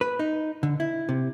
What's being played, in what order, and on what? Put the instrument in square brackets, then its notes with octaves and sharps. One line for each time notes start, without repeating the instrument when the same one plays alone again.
[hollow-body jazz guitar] B4
D#4
D3
E4
C3